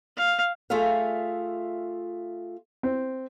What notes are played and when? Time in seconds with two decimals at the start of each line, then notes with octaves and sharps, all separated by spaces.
0.17 F5
0.70 A3 F4 G#4 E5 F5
2.83 C4